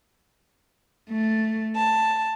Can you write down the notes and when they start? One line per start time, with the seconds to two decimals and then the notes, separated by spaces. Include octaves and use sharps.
1.11 A3
1.76 A5